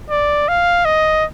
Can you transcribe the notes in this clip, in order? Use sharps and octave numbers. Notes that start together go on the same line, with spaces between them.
D5
F5
D#5